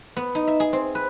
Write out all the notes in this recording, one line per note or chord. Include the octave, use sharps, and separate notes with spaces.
B3
D#4
E5
G#4
C4
B4